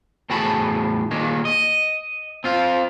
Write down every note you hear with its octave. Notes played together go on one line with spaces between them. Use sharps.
E2 A2 F#4 G#4 A5 B5
D#2 A#2 D#3 G#3
D#5
C4 F4 F5